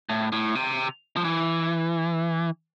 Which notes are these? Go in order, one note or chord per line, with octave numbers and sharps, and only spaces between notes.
A2
A2
C3
F3
E3